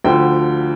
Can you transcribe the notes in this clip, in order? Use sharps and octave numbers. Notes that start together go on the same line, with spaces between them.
D2 D3 F3 G5